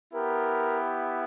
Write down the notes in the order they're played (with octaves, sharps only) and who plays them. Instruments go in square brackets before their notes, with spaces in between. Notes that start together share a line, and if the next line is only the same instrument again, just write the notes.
[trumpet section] B3 E4 G4 A#4